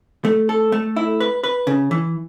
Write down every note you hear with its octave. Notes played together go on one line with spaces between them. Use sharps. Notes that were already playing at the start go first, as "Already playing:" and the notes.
A3
A4
A3
E4
B4
B4
C#3
E3